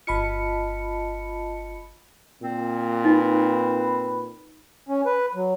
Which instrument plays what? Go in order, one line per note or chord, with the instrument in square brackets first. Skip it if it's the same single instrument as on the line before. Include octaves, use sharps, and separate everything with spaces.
[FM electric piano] G1 B5 C#7 [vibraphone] F4 D#5 A5
[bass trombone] A#2 [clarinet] C4
[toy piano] D#4 [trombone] B4
[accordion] C#4
B4
F#3